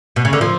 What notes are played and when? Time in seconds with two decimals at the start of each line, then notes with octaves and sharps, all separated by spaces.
0.16 B2
0.25 C#3
0.33 D3
0.41 F3